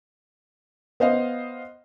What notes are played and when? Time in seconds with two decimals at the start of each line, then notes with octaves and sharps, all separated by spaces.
1.00 B3 C5 D#5 F5